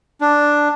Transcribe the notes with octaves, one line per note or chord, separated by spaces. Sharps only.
D4